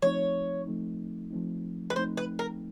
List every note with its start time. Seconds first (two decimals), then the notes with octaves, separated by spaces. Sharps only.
0.02 F3 A3 C4 D#4 C#5
0.67 F3 A3 C4 D#4
1.31 F3 A3 C4 D#4
1.90 B4
1.96 F3 A3 C4 D#4 C5
2.17 B4
2.39 A#4